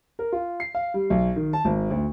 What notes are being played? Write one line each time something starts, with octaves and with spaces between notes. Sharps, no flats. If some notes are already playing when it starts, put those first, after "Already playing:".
A#4
F4
C7
F5
G3
B1
D#3
A5
G#1
D2